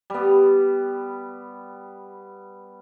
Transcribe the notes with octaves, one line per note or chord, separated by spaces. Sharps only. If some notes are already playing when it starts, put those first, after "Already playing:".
G3 B3